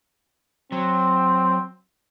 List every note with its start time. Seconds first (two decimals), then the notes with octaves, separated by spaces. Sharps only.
0.72 F#3 C4